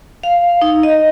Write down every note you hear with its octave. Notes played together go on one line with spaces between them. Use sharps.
F5
D#4
D#5